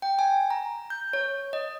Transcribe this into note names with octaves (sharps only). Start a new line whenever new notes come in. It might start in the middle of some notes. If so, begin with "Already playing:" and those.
G5
G#5
A#5
G6
C#5
D#5